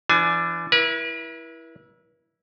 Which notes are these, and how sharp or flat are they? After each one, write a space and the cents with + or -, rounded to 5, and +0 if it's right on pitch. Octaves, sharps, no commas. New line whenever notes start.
E3 +35 D4 +0 G#5 +30
E4 +0 B4 -45